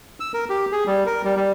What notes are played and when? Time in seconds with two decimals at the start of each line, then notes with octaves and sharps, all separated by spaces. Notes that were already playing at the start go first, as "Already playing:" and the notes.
0.20 E6
0.34 A#4
0.50 G4
0.72 G#4
0.87 G3
1.06 A#4
1.25 G3
1.36 G3